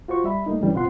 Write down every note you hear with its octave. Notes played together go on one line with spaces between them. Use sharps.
F4 F#4 C5 C#6
G3 E5 B5
G3 A3 A#3 D#4
D3 E3 G3 C#4
B2 C4 F4 F#5 C6